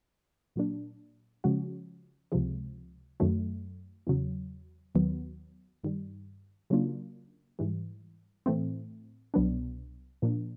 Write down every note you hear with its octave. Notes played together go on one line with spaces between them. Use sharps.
A#2 F#3 A#3 D4
C#3 F3 G#3 C#4 F#4
C#2 C3 F3 G#3
F#2 D#3 F#3 A3
E2 C#3 F#3
D#2 D#3 F#3 B3
G2 D#3 G3
C#3 F#3 A#3 D4 F4
G#2 E3 G3
A2 E3 A3 C4
C2 B2 F#3 B3 D4
A#2 F3 A#3 D4